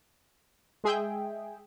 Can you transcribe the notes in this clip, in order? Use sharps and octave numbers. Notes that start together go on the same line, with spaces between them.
G#3 G#4 E5 G5